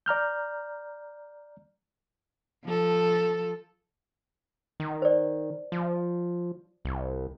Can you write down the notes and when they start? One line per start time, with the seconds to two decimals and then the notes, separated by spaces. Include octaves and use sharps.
0.06 D5 A#5 F6 G6
2.65 F3 A4
4.80 D#3
5.02 C5 D5
5.72 F3
6.85 C2